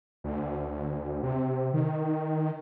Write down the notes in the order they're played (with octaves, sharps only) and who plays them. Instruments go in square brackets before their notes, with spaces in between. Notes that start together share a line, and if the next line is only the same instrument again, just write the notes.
[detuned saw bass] D2
C3
D#3